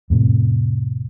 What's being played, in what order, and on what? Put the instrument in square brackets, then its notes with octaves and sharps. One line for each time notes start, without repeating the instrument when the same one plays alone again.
[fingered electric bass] F2 A2 C3